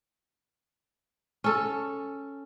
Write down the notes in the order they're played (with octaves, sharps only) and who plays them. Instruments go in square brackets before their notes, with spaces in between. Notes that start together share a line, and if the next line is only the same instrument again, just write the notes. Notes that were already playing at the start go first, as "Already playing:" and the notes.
[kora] C#4 A4